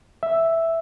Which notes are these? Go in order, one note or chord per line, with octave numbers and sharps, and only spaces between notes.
E5